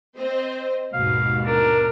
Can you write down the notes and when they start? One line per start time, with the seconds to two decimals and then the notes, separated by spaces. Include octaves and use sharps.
0.17 C4 C5 D#5
0.93 D#2 G#2 B2 F5
1.46 D4 A#4